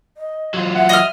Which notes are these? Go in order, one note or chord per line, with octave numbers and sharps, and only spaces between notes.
D#5
F#3 F4
E5 F#5
D#5 F6